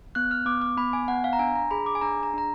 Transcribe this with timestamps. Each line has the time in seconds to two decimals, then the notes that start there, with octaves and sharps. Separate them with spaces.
0.15 B3 F#6
0.31 F6
0.46 B3 D6
0.62 D6
0.77 B3 B5
0.93 G#5
1.08 B3 F#5
1.24 F5
1.33 A#5
1.39 D4 G#5
1.55 A#5
1.71 G#4 B5
1.86 D6
1.95 G#5
2.01 D4 A#5
2.23 A#5
2.34 D4 A#5